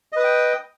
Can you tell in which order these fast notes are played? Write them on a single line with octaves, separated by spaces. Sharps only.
D#5 B4 D#6 G5